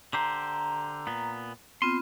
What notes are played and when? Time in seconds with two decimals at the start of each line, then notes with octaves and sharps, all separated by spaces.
0.13 D3 G4 C5 A#5
1.07 A#2 B3
1.82 B3 C4 F4 C6